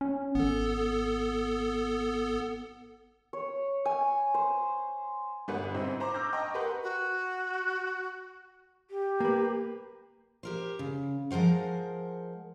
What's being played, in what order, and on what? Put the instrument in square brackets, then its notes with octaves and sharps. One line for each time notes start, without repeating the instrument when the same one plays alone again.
[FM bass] C#4
[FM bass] G#1 [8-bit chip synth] B3 A4
[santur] C#5
G#5
C5
[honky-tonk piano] G1 G3 B3 B4 F#5
G#2 C4 D#4 E4
C5 A#5 C#6 D6
D6 E6 F6 G6 A#6
D#5 G5 A5 A#5 C#6 D#6
G4 A#4 B4 F#5 C6
[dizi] F#4
[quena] G4
[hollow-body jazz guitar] A#3 B4
[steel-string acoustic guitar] G4 A#4 C5
C#3
F3 G#3 A#4 C5 F#5